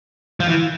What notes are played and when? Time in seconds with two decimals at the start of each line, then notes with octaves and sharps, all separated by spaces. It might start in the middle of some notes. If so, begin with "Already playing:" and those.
0.40 F3
0.48 E3